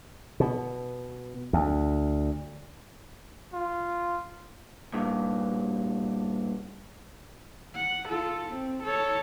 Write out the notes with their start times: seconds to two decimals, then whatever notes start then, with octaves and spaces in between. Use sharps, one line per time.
0.40 B2
1.53 D2
3.54 F4
4.94 G2 A#2
7.76 F#5
8.09 F4 A4
8.50 C4
8.84 A4 C#5